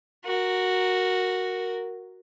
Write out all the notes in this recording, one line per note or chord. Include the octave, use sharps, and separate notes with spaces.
F#4 A#4